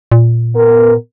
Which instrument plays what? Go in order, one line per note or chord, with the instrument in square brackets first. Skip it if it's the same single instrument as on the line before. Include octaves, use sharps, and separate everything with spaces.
[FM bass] A#2
[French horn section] B3 A#4